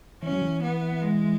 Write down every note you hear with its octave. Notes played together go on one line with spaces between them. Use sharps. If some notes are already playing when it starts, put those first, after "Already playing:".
E3 C#4
F#3
E3
B3
G#3